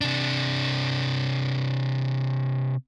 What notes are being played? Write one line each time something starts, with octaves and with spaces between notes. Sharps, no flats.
C3 D4